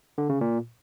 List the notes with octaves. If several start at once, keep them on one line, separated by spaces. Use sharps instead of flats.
D3
C#3
A#2